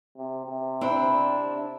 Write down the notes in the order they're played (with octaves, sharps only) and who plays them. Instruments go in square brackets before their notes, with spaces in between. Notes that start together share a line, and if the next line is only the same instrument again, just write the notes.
[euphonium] C3
C3
[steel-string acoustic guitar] C4 D4 E4